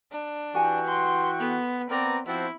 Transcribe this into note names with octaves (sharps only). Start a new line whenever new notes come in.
D4
E3 F#4 G4 G5 G#5 A#5
C6
B3 A4
B3 C4 A#4 D5 A#5
F3 C4 E4 F#4